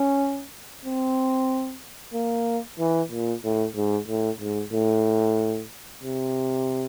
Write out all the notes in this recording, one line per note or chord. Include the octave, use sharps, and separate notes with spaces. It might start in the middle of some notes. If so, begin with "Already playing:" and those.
Already playing: C#4
C4
A#3
E3
A#2
A2
G#2
A2
G#2
A2
C3